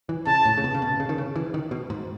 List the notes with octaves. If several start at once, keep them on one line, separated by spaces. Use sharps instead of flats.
E3
C#3 A5
A2
C#3
B2
C#3
B2
C#3
D#3
C#3
E3
D#3
B2
G#2